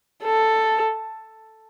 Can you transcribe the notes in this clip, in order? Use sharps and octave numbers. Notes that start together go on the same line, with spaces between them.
A4